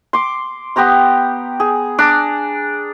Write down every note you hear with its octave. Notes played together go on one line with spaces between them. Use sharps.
C6 D6
B3 G4 A#5 C6
G#4
D4 A#5 D6